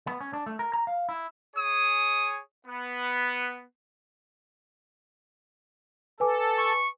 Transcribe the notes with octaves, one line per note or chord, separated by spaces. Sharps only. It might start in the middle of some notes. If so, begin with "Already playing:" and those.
B3
C#4
D4
A3
A#4
A#5
F5
E4
G#4 C#5 G#5 D#6
B3
A4 B4 G#5 D6
C#6